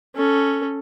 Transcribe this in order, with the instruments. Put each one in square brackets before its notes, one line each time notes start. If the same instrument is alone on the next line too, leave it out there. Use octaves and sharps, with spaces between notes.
[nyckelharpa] C#4 A4